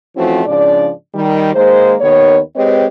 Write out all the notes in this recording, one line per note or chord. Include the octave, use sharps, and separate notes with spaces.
E3 F3 A3 C4 C#4 F#4
G#2 C#3 F3 D4 D5
D#3 G3
D#3 G#3 A#3 C5
D#2 D#3 B3 C#5
G#3 C4 G4 B4 C#5 D#5